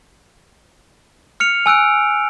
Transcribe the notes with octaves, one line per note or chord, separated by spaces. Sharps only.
F6 C#7 F7
G#5 E6 F#6 D7